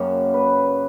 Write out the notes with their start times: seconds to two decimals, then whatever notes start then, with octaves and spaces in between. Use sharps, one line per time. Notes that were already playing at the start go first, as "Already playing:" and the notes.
Already playing: F#2 C#3 F#3 A#3 G4
0.34 B4